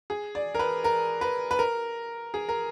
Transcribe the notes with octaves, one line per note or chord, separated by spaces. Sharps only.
G#4
D5
A#4
B4
A#4
B4
B4
A#4
G#4
A#4